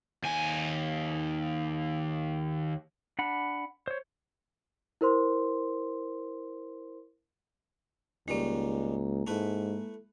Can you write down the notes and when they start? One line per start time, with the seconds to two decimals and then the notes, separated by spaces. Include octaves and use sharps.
0.24 D#2 G#5
3.19 D4 F#5 B5
3.88 C5 C#5
5.01 E4 A#4 C5 C6
8.28 C#2 G#2 D#3 G3 G#3 A#3
9.27 G#2 A3 E4 B4